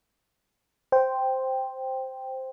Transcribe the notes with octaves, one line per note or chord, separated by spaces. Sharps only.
C5 G5